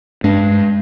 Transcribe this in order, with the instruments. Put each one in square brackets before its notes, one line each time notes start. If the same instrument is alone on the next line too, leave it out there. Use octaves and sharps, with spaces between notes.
[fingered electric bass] G2 D4 [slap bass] G#3